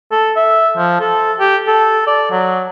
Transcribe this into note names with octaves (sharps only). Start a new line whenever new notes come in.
A4
E5
F3
A4
G4
A4
D5
F#3